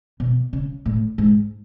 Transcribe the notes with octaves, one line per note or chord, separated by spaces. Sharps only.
B2
C#3
A2
G#2